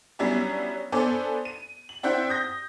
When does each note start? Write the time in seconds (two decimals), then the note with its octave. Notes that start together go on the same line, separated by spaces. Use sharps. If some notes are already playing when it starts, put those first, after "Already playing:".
0.19 F#3 G3 B3 C#4 D4 E4
0.92 B3 D4 A4 C5 D5 G#5
1.45 D#7
1.89 F#7
2.03 C4 D4 E4 C5 F#5 G5
2.29 D#6 G6 A#6